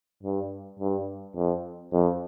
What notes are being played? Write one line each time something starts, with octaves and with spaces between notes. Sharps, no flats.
G2
G2
F2
F2